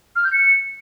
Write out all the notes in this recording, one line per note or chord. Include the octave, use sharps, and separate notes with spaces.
F6
G6
C#7